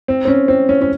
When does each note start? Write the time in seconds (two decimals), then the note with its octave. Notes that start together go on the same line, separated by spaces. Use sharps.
0.08 C4
0.25 C4
0.28 C#4
0.48 C4
0.69 C#4
0.82 C#4